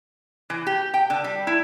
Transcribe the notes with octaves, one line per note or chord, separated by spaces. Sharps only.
E3
G4
G5
D3
G3
E4